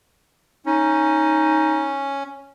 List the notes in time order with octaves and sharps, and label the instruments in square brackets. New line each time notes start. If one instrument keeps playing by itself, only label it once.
[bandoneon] C#4 [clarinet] D#4